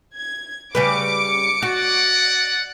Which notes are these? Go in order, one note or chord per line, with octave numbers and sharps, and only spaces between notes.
G#6
C#3 G3 B4 D6 C#7
F#4 D5 D#5 F#5